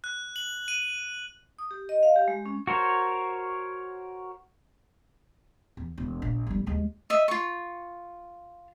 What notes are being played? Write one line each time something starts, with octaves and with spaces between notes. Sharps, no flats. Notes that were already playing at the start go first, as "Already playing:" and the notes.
F#6
F#7
D#7
D#6
G4
D#5
F5
G4
G#3
C#4
F#4 A#4 C5 C#5
E2
E1
A#1
G1 G3
D#2 G#3
D#5 E5
F4 C#6